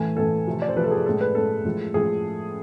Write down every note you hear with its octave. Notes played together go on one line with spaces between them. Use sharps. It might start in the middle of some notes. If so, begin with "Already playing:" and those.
Already playing: A2 E3 A3 G#5
A2 E3 A3 A4
C3 F3 A3
D5
C5
C3 F3 A3 B4
A4
G#4
A2 G#3 A4
B4
A2 G#3 A4
A2 F3 G#3
A2 F3 G#3 G#4